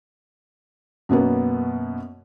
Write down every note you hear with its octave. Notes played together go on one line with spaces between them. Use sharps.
F#2 B2 A#3 B3